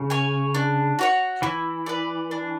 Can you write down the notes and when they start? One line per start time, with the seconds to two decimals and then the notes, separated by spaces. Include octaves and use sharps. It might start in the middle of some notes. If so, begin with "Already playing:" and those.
Already playing: C#3
0.10 C#5 G#5
0.55 D4
0.99 F#4 C#5 F#5
1.42 E3 E4
1.86 B4 D5
2.31 D4